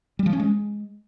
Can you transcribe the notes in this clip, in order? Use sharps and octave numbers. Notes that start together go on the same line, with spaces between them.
G3
F3
C#4
G#3